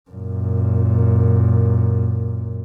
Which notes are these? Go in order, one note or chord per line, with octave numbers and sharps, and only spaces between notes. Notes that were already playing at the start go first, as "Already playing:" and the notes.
F#2 A#2